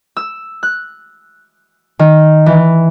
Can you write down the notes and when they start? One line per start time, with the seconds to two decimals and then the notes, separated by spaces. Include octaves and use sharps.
0.17 E6
0.63 F#6
1.99 D#3
2.46 E3